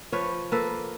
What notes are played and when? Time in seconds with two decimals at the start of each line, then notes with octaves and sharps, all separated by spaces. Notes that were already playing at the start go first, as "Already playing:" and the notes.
0.12 F3 B4 C#5
0.52 A#3 A4 B4